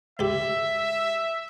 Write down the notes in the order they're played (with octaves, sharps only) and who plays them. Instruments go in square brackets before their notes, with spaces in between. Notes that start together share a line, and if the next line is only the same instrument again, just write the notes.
[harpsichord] C#2 G4 [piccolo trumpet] E5